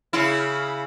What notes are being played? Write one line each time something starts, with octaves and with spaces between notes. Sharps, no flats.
C#3 E4